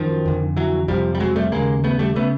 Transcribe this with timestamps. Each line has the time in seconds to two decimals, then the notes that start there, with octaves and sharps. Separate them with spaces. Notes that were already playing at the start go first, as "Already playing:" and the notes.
Already playing: F#2 D#3 F3
0.25 F2 D3
0.57 E3 F#3
0.88 F2 C3 F3 G3
1.15 G3
1.20 F#3 G#3
1.36 G3 A3
1.52 D#2 C#3 G#3 A#3
1.84 A3 B3
1.99 G3 A3
2.16 C#3 A3 B3